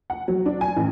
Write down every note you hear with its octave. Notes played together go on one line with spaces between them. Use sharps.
F#5
F#3
D4
G#5
A1